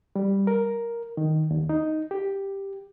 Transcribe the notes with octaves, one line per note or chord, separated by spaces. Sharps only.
G3
A#4
D#3
D#2
D#4
G4